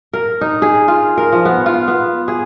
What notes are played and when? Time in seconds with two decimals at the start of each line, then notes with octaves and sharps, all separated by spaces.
0.13 A#4
0.41 D#4
0.62 G#4
0.88 F4
1.17 A#4
1.32 F3
1.45 B3
1.66 F4
1.88 B3
2.28 G#4